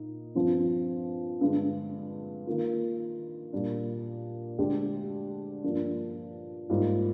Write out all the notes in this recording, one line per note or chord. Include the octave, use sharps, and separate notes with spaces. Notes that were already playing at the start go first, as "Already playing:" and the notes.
Already playing: A#2 D#4
G2 F3 C4 F4
G2 D3 G#3
D#3 A#3 F4
A#2 G3 D4
D2 D3 G#3 D4 G4
G2 F3 A#3 D4
G#2 G3 A#3 F4